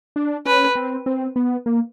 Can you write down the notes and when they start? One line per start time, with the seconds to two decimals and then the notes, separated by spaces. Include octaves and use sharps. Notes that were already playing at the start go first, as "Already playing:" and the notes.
0.16 D4
0.46 C#4 B4
0.75 C4
1.06 C4
1.36 B3
1.66 A#3